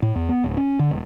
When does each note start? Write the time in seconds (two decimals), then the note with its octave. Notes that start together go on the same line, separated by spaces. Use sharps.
0.02 A2
0.16 E2
0.29 B3
0.44 D1
0.57 C#4
0.79 D3
0.91 E1